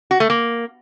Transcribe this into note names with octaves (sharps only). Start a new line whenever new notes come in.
F#4
A3
A#3